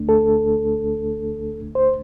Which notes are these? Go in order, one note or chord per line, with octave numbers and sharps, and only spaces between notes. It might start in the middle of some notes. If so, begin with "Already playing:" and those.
Already playing: D2 D3 A3 D4
A4
C5